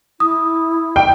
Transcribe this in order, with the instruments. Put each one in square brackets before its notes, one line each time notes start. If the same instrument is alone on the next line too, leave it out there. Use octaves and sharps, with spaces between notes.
[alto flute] E4 [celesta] D#6
[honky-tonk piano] G5